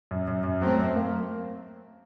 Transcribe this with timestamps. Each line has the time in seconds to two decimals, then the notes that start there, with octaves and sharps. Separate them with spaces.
0.11 F#2
0.28 F#2
0.44 F#2
0.61 F#3 A3 C4
0.79 F#2
0.96 A#3